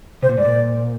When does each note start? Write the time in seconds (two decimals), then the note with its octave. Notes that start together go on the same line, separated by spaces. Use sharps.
0.23 C3 C5
0.29 A#2
0.38 G#2 D5
0.45 A#2